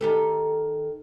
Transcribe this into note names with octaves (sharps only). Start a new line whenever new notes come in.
D#3 G4 A4